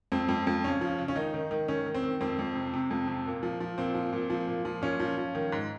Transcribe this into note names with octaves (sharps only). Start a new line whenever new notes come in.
F2 C4
F2
F2
C#3 C#4
F3
C#3
C#4
D#3 D#4
D#3
D#3
D#3 C#4
D#3
C4
D#3
F2 C4
F2
C3
C3
F2
C3
A#2
F3
F3
A#2 C4
F3
A#2
F3
A#2
F3
A#2 C#4
F3
F3
D#3
G#2